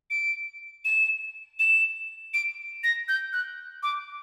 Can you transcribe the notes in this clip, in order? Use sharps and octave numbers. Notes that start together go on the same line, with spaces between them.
D7
E7
E7
D7
A#6
G6
F#6
D6